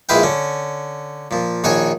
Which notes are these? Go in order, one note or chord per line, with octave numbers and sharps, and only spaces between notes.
A#1 G#3 E4 B4 F5 G5
D3 C#4
A#2 F3
A#1 D#3 F#4 C#5 G#5